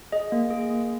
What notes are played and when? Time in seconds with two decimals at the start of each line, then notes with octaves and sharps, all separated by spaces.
0.12 G#4 D#5
0.32 A#3
0.50 G#4
0.70 A#3